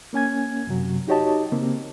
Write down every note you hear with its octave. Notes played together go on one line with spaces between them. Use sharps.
A#3 C#4 G#5 G#6
F#2 C3 F#3
D#4 F#4 G4 C#5 D#5 A5
C#3 A#3 C4